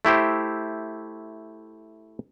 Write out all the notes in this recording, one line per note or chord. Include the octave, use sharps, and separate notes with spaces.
A3 E4 G4 C5